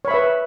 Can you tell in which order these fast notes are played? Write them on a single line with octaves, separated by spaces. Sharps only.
C#5 B5 E5 B4